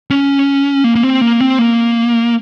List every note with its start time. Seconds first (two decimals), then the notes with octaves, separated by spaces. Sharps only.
0.10 C#4
0.84 A#3
0.95 A#3
1.03 C4
1.21 A#3
1.41 C4
1.59 A#3